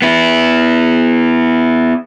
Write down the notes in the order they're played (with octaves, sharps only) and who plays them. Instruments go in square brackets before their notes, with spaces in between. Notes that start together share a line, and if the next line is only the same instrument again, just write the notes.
[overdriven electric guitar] B3 E4